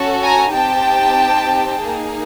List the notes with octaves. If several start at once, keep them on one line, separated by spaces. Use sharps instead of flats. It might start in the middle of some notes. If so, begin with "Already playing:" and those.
Already playing: C#4 F#4 A4
G#5 A#5
C4 D#4 G4 G5 A5
A#3 D#4 G#4